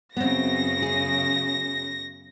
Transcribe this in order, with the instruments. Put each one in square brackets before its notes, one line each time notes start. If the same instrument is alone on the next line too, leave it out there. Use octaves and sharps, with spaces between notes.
[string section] F#2 C#3 [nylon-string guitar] B3 C4 [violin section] A#6
[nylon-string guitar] G#4